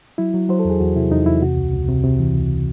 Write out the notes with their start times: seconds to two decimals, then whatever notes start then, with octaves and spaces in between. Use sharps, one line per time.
0.18 F#3 E4
0.34 F#3
0.49 F#3 C5
0.59 A4
0.65 E2
0.70 G#4
0.80 E2 F#4
0.96 C3 E4
1.11 E2 D#4
1.26 E2 E4
1.42 C3 F#4
1.57 C#2
1.74 C#2
1.89 C3
2.04 C3
2.19 E3
2.35 C#2